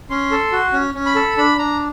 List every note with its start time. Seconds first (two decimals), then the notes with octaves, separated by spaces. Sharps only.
0.10 C#4 C6
0.31 A4
0.52 F#4
0.73 C#4
0.94 C#4
1.06 B5
1.15 A4
1.37 D4 B5
1.58 D4 A#5